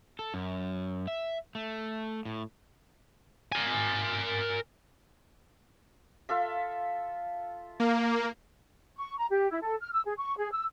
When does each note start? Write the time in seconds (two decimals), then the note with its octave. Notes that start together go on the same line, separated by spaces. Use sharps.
0.19 A4
0.34 F#2
1.08 E5
1.55 A3
2.25 A2
3.52 A#4 G#5
6.29 F4 A4 E5
7.80 A#3
8.97 C#6
9.18 A#5
9.30 G4
9.51 E4
9.63 A4
9.81 F6
9.93 E6
10.06 G#4
10.17 C#6
10.37 G#4
10.52 E6